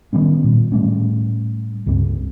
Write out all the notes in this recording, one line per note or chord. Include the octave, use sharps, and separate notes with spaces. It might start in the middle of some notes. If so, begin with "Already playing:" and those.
D#3 G3 B3 C#4
A#2
A2 G3 A3 C#4
C#2 G2 G3 C4